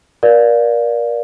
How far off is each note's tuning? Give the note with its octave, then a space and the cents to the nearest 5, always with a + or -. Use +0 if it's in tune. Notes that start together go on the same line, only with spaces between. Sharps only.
A#4 +35 D5 +0 F5 +10